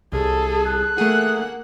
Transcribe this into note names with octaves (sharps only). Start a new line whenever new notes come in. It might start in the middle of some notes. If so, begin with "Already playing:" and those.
C2 G#4 A4
F#6
A3 A#3 G#4 F#5